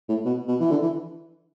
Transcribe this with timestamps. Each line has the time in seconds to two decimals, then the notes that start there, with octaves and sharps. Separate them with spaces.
0.09 A2
0.25 B2
0.48 B2
0.60 E3
0.71 D3
0.82 E3